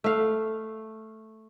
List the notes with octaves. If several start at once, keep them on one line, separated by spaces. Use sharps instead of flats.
A3 F5